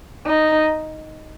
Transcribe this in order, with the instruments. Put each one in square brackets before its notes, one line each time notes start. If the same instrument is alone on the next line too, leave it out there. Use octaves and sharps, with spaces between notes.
[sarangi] D#4